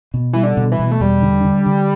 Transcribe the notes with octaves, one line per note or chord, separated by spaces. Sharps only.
B2
E3 G3
D3
B2
E3
B2
A3
E2 G3
D3
D3
D3